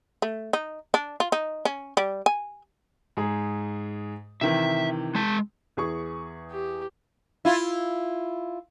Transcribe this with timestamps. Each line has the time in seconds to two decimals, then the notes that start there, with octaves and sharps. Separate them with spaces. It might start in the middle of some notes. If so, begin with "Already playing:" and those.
0.22 A3
0.53 D#4
0.94 D4
1.20 F4
1.32 D#4
1.65 C#4
1.97 G3
2.26 G#5
3.17 G#2 G#4
4.41 C3 D#3 E3 E5
5.15 G#3 A5
5.77 E2 G#4 C#6
6.51 G4
7.45 E4 F4